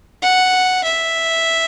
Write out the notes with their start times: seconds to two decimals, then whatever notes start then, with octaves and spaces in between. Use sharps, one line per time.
0.22 F#5
0.84 E5